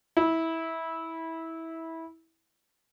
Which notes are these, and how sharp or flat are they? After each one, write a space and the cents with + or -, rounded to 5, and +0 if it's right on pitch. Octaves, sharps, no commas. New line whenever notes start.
E4 -20